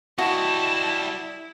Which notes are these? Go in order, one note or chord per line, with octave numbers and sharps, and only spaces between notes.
G3 E4 F#4 D#5 A5